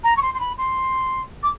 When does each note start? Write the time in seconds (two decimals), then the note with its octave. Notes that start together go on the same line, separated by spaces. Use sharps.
0.04 A#5
0.17 C#6
0.22 C6
0.34 C6
0.40 B5
0.58 C6
1.43 D6